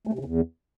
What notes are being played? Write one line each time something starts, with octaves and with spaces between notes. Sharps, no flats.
A3
C3
C#3
E2